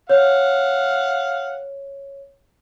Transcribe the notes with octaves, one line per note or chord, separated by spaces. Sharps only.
C#5 F5 F#5